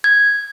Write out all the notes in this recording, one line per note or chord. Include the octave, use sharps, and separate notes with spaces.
G#6